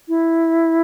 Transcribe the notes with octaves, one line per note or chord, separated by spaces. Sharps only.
E4